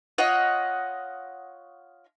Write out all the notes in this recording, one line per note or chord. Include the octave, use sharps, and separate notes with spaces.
F4 C#5 D#5 F#5